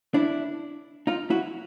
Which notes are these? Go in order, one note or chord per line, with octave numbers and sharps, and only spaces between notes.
D4 E4
D#4 F4
E4 F#4